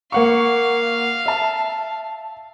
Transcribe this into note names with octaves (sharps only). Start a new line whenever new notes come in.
A#3 F5 F#5 C#6
E5 A5